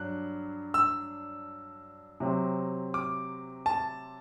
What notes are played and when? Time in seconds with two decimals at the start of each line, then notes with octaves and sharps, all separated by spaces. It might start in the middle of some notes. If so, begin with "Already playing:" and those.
Already playing: G2 F#3 D4 F#6
0.74 E6
2.20 C3 F#3 C4
2.94 D6
3.66 A5